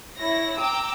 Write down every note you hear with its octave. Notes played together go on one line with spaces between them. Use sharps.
E4 C#5 A#6
G5 A#5 D6 E6